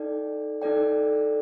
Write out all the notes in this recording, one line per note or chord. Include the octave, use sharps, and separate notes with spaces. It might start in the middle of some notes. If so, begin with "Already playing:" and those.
Already playing: D#4 A4 D5 G5
D#4 A4 D5 G5